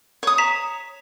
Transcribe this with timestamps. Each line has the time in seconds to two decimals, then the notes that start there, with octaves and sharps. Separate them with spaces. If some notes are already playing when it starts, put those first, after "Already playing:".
0.23 C#5 D#6
0.38 A#5 B6 E7